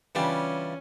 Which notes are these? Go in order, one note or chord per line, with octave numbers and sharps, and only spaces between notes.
C#3 E3 G3 C#4 D4 F4 G4